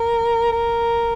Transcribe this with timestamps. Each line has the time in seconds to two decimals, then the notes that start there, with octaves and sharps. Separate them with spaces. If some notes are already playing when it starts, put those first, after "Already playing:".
Already playing: A#4
0.52 A#4